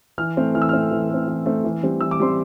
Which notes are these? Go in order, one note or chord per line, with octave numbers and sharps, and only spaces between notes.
E3 F6
A3 C4
E3 F6
E6
A3 C4 F6
E3
A3 C4
E3
A3 C4
E3
G3 C4
E3 E6
D6
G3 C4 C6